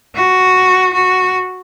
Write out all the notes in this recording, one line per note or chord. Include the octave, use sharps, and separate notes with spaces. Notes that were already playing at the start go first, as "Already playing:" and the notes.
F#4
F#4